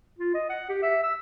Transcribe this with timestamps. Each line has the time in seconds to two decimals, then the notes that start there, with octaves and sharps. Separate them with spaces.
0.18 F4
0.34 D#5
0.49 F#5
0.69 G4
0.83 E5
1.03 E6